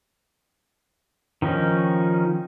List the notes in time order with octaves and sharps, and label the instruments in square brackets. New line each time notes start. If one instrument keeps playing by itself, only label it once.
[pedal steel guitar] D#3 F3 C#4 D#4